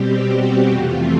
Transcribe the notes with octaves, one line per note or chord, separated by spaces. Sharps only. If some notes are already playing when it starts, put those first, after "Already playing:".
Already playing: B2 G3 C4 G4
F#4
F2 C3 E3 A3 F4